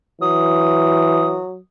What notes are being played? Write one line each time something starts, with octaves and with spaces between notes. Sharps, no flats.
E3 F#3 D#6